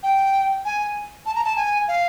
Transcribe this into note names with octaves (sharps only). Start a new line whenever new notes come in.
G5
G#5
A5
A#5
A5
G#5
F5